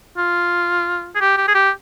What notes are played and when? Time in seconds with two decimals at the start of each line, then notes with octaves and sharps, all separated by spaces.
0.18 F4
1.15 G#4
1.21 G4
1.38 G4
1.48 G#4
1.55 G4